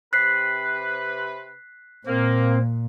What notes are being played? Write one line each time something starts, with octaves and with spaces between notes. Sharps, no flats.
C3 B4 F#6 B6 C7
A#2 A#3 C4